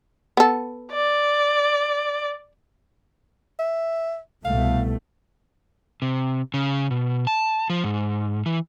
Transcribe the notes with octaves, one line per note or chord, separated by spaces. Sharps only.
B3 A4
D5
E5
C2 B2 A3 F5
C3
C#3
B2
A5
F3
G#2
E3